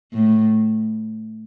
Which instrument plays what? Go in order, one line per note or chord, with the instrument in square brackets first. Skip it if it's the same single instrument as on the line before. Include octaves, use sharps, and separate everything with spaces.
[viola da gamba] A2